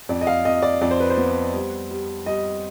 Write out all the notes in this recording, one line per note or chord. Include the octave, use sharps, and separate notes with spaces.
F2 D5
D#5
F5
F2 D#5
D5
F2 D5
C5
B4
C5
B3
G3
G3
G3 D#5